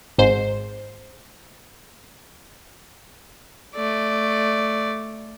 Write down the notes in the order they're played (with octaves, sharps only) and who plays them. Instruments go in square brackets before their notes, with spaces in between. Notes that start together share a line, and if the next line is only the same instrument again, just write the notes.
[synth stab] G#1 G#2 C5
[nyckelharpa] A3 D5